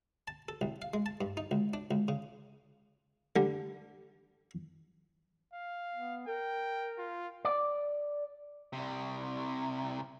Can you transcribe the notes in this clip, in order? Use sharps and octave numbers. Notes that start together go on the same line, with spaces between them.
A5
A4
C2
F5
G#3
A5
G2
D#4
C#2
D4
C#2
C#3
D3 G3
F5
B3
A#4 G5
F4
D5
C2 C3